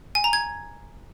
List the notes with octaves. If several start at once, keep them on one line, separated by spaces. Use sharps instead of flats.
G#5
A#5
G#6